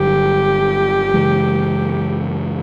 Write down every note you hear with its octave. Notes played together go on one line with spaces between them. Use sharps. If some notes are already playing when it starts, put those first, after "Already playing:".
Already playing: G1 G2 D3 F#3 G4
F#2 C#3 E3 G#3